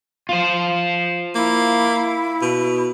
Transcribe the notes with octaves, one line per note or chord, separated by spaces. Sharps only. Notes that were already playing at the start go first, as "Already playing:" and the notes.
F4 C5
A#3 E4
B2